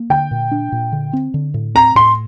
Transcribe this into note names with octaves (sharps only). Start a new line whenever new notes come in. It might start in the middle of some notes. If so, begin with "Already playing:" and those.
Already playing: A#3
D3 G5
A#2
D4
A#2
D3
C4
D3
A2
C4 A#5
A2 C6